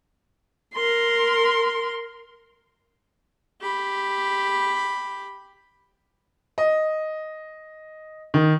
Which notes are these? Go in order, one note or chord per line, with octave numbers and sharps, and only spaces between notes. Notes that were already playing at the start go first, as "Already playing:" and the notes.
A#4 C6
G4 B5
D#5
D#3